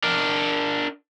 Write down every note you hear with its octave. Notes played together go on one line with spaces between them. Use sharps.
D4 A#4